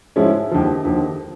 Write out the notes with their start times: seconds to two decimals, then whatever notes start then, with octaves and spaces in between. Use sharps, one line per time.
0.16 G#2 F3 G#3 C#4 E4
0.51 D#2 D3 F3
0.85 D#2 D3 F3